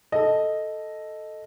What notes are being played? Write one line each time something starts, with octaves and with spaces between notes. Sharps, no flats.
A4 D#5